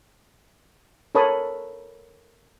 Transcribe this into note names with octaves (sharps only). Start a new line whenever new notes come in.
A4 A#4 C#5 A5 B5 D#6